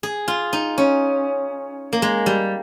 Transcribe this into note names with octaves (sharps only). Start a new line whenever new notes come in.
G#4
F4
D#4
C#4
A#3
G#3
G3